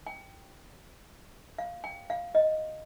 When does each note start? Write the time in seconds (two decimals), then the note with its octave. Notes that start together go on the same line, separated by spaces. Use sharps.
0.07 G5
1.58 F5
1.84 G5
2.10 F5
2.35 D#5